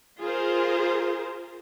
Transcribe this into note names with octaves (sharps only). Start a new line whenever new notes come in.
F4 G#4 A#4 C5